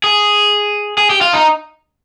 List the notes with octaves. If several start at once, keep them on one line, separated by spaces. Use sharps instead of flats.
G#4
G#4
G4
F4
D#4